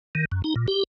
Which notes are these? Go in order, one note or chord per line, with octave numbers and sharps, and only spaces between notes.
D#3
F#2
D#4
A#2
G4